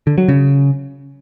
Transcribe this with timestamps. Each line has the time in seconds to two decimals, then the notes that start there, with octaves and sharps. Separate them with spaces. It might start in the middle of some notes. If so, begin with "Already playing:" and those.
0.07 D3
0.18 F#3
0.28 C#3